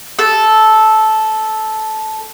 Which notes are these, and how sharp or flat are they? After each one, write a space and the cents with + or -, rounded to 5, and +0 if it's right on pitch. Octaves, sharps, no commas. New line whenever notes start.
A4 -10